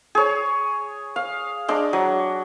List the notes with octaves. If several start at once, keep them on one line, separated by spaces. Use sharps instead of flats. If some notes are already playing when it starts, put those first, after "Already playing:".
G#4 C#5
F5
G#3 D4
F#3